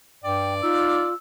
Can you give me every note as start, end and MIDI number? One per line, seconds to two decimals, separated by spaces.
0.24 0.59 43
0.24 1.07 74
0.24 0.54 79
0.63 1.05 63
0.63 1.14 65
0.63 1.14 88